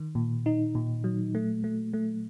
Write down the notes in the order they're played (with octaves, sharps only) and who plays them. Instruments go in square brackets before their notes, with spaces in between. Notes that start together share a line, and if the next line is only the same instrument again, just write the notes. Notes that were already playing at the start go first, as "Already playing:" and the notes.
Already playing: [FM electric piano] D#3
A#2
D#4
A#2
F#3
A3
A3
A3